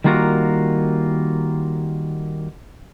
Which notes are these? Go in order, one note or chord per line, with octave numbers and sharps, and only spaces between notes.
D#3 G3 A#3 F4 F#4 A#4